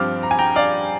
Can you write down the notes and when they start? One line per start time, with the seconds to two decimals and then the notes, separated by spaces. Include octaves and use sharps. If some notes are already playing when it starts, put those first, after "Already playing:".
Already playing: G2 F3 C4 D6 F6
0.23 A#5
0.31 G#5
0.39 G5 A#5
0.56 D5 F5